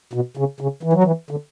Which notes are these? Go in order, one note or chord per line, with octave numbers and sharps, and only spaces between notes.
B2
C#3
C#3
E3
F#3
E3
D3